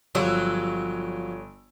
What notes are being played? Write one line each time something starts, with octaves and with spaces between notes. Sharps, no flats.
G1 F3 F#3 G4 C#5 E6